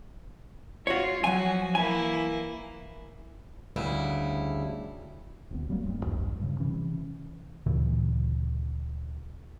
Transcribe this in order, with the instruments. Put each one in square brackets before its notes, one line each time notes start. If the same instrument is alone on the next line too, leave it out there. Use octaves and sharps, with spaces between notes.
[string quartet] F4 [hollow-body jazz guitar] F#4 C#5
[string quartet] F3 F#4 [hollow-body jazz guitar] F#3 G#5
[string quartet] E3 A#3 E4 [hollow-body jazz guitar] G#5
[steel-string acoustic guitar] D2 C#3 G3 E4
[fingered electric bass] D#1 D2 B3
F#3 G3 A3 A#3
D#1 G2
B1 E2 G2
G2 C#3
C3 E3 C#4
[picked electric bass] D2 A#2 C#3 E3